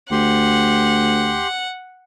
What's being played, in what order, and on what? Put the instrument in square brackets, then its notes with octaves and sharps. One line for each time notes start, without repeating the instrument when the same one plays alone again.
[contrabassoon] D2 [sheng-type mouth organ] G4 C6 [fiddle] F#5